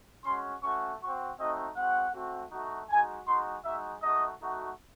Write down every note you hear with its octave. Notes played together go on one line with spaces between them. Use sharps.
G#3 C#4 F#4 C6
A3 C#4 F#4 C#6
C4 F#4 C#6
A3 C4 D#4 F#4 D#5
G#3 C4 F#4 F#5
A3 C4 F#4
A3 D#4 F#4
G#3 D#4 F#4 G#5
G#3 D#4 F#4 C6
G#3 D#4 F#4 E5
A3 D#4 F#4 D#5
A3 D#4 F#4